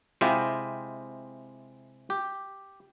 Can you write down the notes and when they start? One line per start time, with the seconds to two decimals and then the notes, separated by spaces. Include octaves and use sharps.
0.21 C3 G#3 E4 F4 G4
2.10 G4